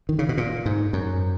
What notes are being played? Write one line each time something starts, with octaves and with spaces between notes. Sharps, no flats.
D#3
C#3
B2
A#2
G#2
F#2